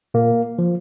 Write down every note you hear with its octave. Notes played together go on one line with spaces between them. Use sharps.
A#2 A#3
F3